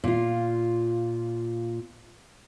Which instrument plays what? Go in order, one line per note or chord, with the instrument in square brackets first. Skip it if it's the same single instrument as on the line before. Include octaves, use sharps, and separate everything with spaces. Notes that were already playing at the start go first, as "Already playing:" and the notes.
[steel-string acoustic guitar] A#2 F4